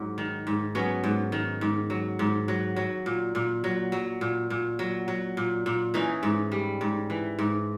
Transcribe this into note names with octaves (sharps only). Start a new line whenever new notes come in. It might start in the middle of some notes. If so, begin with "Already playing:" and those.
Already playing: G#2 F#3
D#3
G#2
F#3 B3 C#4
G#2
D#3
G#2
F#3
G#2
F#3
F#3
A#2
A#2
F#3
F#3
A#2
A#2
F#3
F#3
A#2
A#2
E3 C#4 D#4
G#2
G3
G#2
E3
G#2